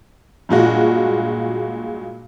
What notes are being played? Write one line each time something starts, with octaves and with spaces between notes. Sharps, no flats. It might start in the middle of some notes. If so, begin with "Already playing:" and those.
G2 A#2 G#3 F#4